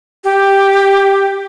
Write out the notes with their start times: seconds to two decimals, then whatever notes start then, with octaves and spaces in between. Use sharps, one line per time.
0.24 G4